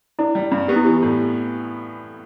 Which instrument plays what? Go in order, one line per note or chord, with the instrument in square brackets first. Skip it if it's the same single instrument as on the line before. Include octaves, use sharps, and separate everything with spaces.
[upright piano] D4 [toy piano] E4
[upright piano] G3
G2
[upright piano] B3 [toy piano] G4
[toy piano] E4
[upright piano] E3 [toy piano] G4
[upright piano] A2